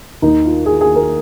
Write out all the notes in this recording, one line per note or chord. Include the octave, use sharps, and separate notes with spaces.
D#2 D#3 D#4
F4
G#4
G#4
A#4